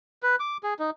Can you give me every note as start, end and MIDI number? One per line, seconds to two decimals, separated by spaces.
0.23 0.36 71
0.40 0.57 86
0.63 0.74 68
0.79 0.90 63